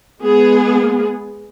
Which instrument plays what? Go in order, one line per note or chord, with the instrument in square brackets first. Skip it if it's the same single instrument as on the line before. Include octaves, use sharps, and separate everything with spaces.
[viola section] G#3 B3 G#4